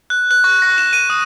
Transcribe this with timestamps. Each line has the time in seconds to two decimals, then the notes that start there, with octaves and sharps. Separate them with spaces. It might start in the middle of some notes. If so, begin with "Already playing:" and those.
0.10 F#6
0.31 F#6
0.44 C#6
0.62 A#6
0.78 E7
0.93 D#7
1.10 D#6